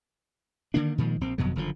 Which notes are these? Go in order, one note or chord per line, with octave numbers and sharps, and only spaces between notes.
D3 D#3 A#3 D4
A#2 D#3 F3 G#3
A#1 C4
G1 F2 B2 F#3
F#1 D3 F3